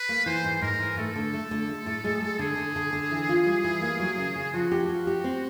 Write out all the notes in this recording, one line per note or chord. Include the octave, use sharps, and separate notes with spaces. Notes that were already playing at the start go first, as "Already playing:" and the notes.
Already playing: B4
A#3
E3 C5
G#2
G#2 A#4
E3
A3 A4
D3
A3
D3
G#3
A2
G#3
G#3
D3 G#4
D3
D3
D3
E3
F4
G3
E3
A#3
F#3
C#3
C#3
F3 F#4
G4
F3
G4
C4